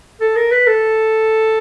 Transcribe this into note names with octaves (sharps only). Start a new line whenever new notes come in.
A4
A#4
B4
A4